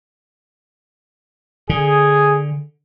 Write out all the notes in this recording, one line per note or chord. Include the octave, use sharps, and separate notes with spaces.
D3 G#4